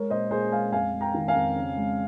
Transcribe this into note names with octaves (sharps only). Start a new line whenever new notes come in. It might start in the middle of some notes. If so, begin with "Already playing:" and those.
Already playing: G#3 A#4 C#5
A#2 C5 D#5
A#2 G#4 C5
G#3 F5 G#5
F2 F5 G#5
G#3
G5 A#5
D#3
F5 G#5
F2
C#3
G#3